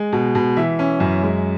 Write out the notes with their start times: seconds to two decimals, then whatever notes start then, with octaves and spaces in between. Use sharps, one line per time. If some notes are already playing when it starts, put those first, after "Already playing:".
Already playing: G#3
0.12 B2
0.35 B2
0.57 E3 E5
0.79 C#4
1.00 F#2
1.23 G#3